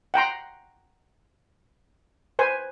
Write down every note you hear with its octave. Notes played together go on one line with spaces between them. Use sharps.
F#5 G5 A#5 C6
B4 C5 G#5